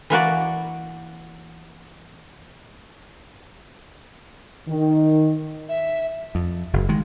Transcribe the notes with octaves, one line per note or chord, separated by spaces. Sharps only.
E3 A#3 F#4 D5
D#3
E5
F2
F#1
D#3 G#3